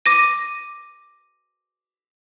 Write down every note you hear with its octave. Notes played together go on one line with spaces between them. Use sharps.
D6 A#6 D#7